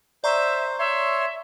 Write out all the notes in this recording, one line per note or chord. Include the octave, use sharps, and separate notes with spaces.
C5 D5 E5 A#5 C#6
C#5 E5 C6